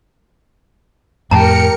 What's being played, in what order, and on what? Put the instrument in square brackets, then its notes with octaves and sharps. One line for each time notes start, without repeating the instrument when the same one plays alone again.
[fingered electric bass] F2 A2 [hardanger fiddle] G4 [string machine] A#4 C#7 [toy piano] A5 A#5